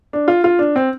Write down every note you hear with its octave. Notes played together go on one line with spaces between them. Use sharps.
D4
F4
F4
D4
C4